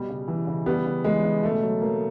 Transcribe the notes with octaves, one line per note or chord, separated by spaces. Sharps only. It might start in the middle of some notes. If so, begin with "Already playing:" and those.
Already playing: B2 G3
C#3
E3
C#3
G3 B3
C#3
E3 G#3
C#3
B2 A3
F#3
F#3 A#3